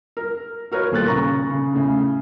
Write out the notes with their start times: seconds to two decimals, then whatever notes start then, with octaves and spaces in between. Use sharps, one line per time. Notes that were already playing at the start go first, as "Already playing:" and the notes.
0.17 A#4
0.72 F#4 A#4 B4 C#5
0.92 D#1 A#2 A4 F#6 A6
1.07 C#3 A#5 C#6 A#6
1.51 C#3
1.75 A2 C#3